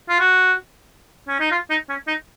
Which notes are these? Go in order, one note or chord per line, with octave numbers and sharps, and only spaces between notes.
F4
F#4
C#4
D#4
F4
D#4
C#4
D#4